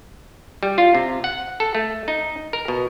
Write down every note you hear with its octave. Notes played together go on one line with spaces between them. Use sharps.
G3
F4
C3
F#5
A4
A3
D#4
A#4
B2